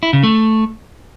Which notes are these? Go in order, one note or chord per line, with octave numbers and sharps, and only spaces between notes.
E4
C#3
A3